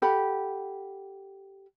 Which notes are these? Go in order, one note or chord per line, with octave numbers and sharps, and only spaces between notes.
G4 A4 F#5 B5